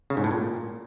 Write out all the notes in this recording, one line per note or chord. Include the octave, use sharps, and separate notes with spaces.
C#3
G#2
A2
A#2